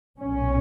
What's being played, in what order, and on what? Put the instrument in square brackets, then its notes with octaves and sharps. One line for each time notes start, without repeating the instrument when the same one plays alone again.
[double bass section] B1 A#2 C#4